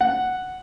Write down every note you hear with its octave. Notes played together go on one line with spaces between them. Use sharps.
F#5